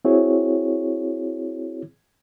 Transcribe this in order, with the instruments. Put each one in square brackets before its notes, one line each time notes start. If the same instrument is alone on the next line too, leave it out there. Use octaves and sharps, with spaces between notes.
[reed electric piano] C4 E4 F#4 G#4 C#5